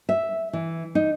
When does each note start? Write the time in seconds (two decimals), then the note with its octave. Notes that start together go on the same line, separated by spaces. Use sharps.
0.09 E5
0.53 E3
0.95 D#4